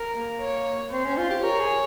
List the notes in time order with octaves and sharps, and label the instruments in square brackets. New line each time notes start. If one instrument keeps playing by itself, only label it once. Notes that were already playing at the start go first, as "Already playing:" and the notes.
Already playing: [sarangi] A#4
[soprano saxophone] A#3
[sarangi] C#5
[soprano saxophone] C4 [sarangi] C5
[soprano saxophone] C#4
F4
G4
[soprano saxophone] A#4 [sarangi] C#5
[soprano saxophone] G#4